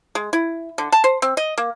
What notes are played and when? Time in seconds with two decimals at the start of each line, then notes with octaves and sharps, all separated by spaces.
0.15 G#3
0.33 E4
0.78 D3
0.92 A5
1.04 C5
1.22 C4
1.37 D#5
1.58 A#3